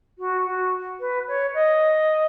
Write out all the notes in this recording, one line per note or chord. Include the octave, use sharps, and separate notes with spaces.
F#4
F#4
B4
C#5
D#5